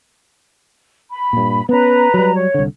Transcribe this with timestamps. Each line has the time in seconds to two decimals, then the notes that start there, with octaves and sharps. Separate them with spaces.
1.12 B5
1.33 G2 A#2
1.69 B3 C#4 B4 A#5
2.14 F#3 G3
2.34 C#5
2.54 C2 D3